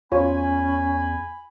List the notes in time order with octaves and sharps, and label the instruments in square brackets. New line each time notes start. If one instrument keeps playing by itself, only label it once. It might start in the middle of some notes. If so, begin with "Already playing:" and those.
[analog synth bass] E2 [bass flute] C#4 [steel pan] F4 C#5 [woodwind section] G#5 B5